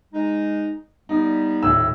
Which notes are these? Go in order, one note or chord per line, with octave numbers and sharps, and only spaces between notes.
G#3 D#4
G3 B3 D#4
D#1 A2 E6